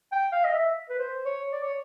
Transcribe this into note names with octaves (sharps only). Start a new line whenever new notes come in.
G5
F5
D#5
E5
B4
C5
C#5
D5
C#5